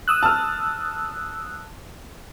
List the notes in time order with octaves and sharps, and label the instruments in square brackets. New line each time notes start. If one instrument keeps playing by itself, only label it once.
[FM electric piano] D#6 E6 F#6
[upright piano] A5 F6